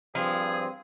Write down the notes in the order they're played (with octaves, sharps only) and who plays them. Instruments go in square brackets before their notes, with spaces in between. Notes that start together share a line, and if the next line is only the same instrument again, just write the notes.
[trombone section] G2 C4 [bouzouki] F3 [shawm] G#4